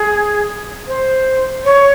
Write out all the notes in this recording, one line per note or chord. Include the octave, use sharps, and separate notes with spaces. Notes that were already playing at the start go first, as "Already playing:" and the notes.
Already playing: G#4
C5
C#5